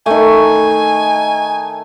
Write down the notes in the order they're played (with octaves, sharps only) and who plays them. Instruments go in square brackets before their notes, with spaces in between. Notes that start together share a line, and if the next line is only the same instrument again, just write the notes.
[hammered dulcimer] D#3 A3 [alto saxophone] G#5